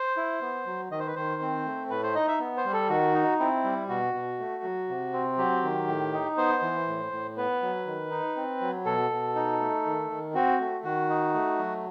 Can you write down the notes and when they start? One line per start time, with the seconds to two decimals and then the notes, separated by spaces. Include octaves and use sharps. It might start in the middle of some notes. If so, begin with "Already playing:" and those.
Already playing: C5
0.17 E4
0.42 B3
0.66 F#3
0.91 D#3 D#5
0.99 C5
1.07 B4
1.15 D#3 C5
1.42 C4
1.66 A3
1.90 A2 B4
2.03 C5
2.15 D#4 D#5
2.28 E5
2.40 B3
2.57 C5
2.65 G3
2.73 A4
2.90 D#3 F#4
3.14 D#4
3.39 C4 E4
3.64 G3
3.89 B2 F#4
4.14 B2
4.39 A3
4.63 F#3
4.89 C3
5.13 C4
5.38 F#3 G4
5.63 D#3
5.88 A2
6.13 D#4
6.37 B3 C5
6.62 E3
6.88 A2
7.12 A2
7.37 B3 B4
7.62 F#3
7.86 D#3
8.11 D#4
8.36 C4
8.61 F#3
8.85 B2 A4
9.11 B2
9.35 D#4
9.61 A3
9.86 D#3
10.10 D#3
10.35 C4 F#4
10.60 A3
10.84 D#3 F#4
11.09 D#4
11.34 A3
11.59 F#3